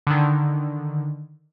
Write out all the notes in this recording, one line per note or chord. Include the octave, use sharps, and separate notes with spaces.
D3 D#3